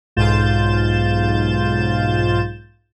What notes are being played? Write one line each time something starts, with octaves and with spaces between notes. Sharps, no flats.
B1 G#2 F4 G6 A6 E7